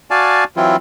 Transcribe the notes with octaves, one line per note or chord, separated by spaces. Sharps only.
F#4 D5 F5 G#5 A5
E3 F#3 C4 E4 F4